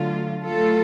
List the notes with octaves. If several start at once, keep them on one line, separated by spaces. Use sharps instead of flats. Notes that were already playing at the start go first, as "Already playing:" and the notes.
Already playing: D3 F#3 A3 F4
F#3 A3 F4 A4